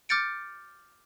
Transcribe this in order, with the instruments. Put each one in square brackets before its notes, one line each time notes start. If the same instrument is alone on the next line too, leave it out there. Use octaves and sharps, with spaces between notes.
[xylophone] D6 F6 G6 A6 C#7 D7